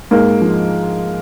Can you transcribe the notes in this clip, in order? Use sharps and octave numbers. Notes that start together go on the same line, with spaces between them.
G#2 G#3 A#3
F3